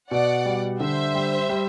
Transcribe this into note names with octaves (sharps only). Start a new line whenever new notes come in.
B2 D5 F#5
G3
D3 C5 E5
G3
G3